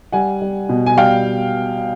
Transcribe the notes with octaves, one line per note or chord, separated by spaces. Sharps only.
G3 F#5 G#5
G3
B2
G#5
G3 F5 G5